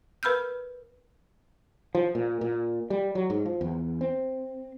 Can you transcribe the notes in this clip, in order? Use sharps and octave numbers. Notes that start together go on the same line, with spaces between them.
A#4 B4 B5 E6 F6 G6
F3
A#2
A#2
G3
F#3
G#2
F3
E2
C4